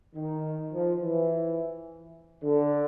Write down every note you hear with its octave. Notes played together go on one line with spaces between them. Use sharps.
D#3
F3
E3
D3